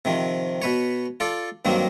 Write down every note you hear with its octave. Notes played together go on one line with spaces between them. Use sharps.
C3 D#3 F3
B2 B4 C#5
F4 A4 D5
G2 D#3 F#3 A#3 C4